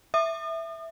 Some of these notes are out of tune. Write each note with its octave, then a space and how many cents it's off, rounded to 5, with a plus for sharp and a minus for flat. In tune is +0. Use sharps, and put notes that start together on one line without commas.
E5 +0 D#6 -40